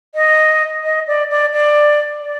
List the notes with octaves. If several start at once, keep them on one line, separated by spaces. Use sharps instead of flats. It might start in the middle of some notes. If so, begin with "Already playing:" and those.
D#5
D#5
D5
D5
D5
D5